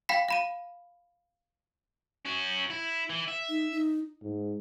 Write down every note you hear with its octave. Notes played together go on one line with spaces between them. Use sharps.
F5 G5 B5 B6
F5 B5 D#7
C#4 F#4
E4
E3
E5
D#4
D#4
G#2